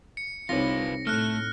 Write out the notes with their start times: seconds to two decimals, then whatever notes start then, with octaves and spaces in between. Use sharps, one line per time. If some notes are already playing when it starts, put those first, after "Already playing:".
0.17 C#7
0.49 C2 C4 D#4 F4 B4 C#5 A#6
1.07 A2 A3 F6 F#6